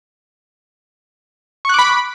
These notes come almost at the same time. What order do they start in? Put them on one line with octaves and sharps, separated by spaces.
C#6 F#6 D6 B5